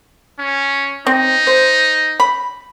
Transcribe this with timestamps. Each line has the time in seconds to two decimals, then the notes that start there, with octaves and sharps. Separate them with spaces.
0.39 C#4
1.07 C4 D#4
1.47 C5
2.20 B5